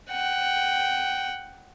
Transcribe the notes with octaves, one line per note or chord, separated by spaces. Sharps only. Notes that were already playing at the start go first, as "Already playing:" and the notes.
F#5 G5